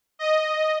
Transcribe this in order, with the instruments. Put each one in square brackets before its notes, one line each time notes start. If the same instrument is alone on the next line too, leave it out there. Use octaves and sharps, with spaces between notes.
[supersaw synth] D#5